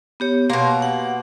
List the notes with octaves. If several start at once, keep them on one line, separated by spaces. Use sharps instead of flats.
B3 G4 C#5
B2 A#3 C6
F#5